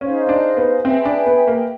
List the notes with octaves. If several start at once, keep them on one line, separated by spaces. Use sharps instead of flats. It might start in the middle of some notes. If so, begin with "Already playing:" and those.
C#4 D#4 G#4 C5 F5
D4
B3
C4 G#4 B4 E5 G5
D4
B3
A#3